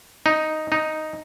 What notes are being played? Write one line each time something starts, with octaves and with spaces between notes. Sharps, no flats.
D#4
D#4